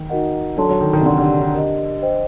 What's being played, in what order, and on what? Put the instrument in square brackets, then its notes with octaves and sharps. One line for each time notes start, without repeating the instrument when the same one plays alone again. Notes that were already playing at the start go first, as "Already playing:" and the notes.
Already playing: [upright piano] D#3
[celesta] D#4 F#4 A#4 D#5 F#5
[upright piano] F#3 [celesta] D4 A4 D5 A5 C6
[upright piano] F#3
D#3
D#3
C3
[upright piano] D3 [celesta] G4 D5 F#5 C6
[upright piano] D3
D3
[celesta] G4 A#4 D#5
C5 D#5 G5